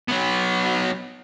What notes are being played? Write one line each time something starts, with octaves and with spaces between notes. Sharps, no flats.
F#3 B3